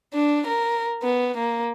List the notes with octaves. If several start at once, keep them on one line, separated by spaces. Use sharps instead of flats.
D4
A#4
B3
A#3